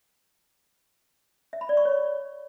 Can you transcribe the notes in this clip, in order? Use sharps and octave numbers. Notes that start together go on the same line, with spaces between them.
E5
B5
D5
C#6
C#5